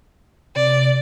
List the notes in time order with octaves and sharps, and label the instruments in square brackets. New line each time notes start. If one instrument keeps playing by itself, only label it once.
[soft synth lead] C3 [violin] D5